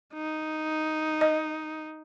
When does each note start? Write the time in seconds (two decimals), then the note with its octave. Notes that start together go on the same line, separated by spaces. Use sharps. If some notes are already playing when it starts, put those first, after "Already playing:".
0.14 D#4
1.21 D#5